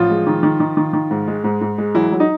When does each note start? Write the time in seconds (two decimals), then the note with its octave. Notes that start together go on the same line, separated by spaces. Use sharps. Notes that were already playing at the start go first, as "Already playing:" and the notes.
Already playing: A1 F3 F4
0.10 G#3
0.27 D#3
0.43 D#3
0.60 D#3
0.77 D#3
0.93 D#3
1.11 G#2
1.28 G#3
1.44 G#2
1.61 G#2
1.78 G#3
1.94 E3 F#3 E4
2.12 F#3
2.20 D#4